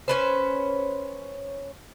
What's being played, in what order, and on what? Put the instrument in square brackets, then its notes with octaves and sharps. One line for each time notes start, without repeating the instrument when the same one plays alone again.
[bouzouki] C#4 B4 C5